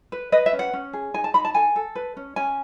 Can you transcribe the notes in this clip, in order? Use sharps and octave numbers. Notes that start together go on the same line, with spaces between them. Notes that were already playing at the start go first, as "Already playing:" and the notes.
B4
B4 D#5
E5
C#4
F#5
C#4
G#4
D#4 G#5
A5
D#4 B5
A5
A4 G#5
A4
B4
C#4
C#4 G#5